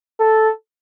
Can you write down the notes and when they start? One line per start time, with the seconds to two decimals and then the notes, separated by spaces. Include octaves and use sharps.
0.20 A4